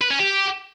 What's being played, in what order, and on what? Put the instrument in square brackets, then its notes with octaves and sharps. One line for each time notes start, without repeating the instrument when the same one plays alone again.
[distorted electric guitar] B4
C#4
G4